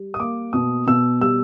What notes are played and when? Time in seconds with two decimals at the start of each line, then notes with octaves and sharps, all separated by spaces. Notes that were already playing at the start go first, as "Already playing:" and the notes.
Already playing: G3
0.14 D#6
0.20 A#3 D6
0.53 B2 D#6
0.87 B2 E6
1.21 G3 E6